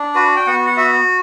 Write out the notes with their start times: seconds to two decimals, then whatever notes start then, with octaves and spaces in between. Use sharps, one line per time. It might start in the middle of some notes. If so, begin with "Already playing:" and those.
Already playing: D4
0.15 F#4 B4
0.36 G5
0.47 B3 F#5
0.66 F#5
0.77 F#4 E5